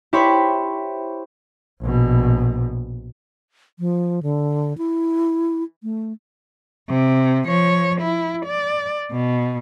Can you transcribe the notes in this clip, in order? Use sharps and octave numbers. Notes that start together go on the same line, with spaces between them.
E4 G4 C5 C#5 B5
A#1 B2
F3
D3
E4
A3
C3
F3 C#5
E4
D5
B2